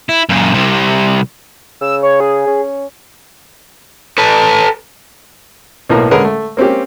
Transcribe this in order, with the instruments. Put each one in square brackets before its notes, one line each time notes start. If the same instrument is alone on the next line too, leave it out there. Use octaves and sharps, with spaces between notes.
[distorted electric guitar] E4
F#2 A#2
C2 C3
[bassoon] C#3 [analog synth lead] E6
[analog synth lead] C#5
G#4
[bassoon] C#4
[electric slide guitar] A4 B4
[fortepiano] B1 A2 A#3 A#5
D3 G#3 C#4 A#4 B4
A3
A#3 C4 C#4 G4